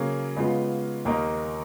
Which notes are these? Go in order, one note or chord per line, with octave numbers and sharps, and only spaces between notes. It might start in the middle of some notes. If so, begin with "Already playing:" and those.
Already playing: C#3 F#3 A#3 C#4 G#4
C#3 G#3 B3 F4
D#2 D#3 A#3 D#4